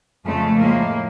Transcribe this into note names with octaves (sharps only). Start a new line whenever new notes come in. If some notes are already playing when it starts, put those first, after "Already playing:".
F2 C#3 F3 G#3 A3
A2 F3 G#3 A#3